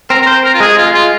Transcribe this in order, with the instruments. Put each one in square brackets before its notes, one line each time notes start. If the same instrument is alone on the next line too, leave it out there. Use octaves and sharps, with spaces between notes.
[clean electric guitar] C4 [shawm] A#4
[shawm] A#4
C5
A#4
F4
[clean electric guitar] G#3 [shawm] G#4
[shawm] F4
[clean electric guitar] G#3
[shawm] F4